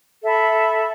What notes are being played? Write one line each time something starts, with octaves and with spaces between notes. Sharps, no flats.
A4 E5 B5